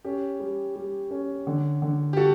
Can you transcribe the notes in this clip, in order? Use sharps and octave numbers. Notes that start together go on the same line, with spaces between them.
C#4 G4
G3
G3
C#4
D3
D3
G4
G3 F#4 A4